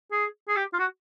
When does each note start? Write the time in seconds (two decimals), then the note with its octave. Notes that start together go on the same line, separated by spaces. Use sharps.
0.12 G#4
0.49 G#4
0.57 G4
0.74 F4
0.79 F#4